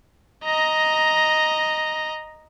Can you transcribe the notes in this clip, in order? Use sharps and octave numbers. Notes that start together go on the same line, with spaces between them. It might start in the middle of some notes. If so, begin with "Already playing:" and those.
D#5 A#5